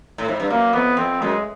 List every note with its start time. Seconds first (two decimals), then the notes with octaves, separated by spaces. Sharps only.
0.18 A2
0.28 G#2
0.40 G2
0.50 F#2 A#3
0.73 F2 B3
0.97 F2 C4
1.21 F#2 G#3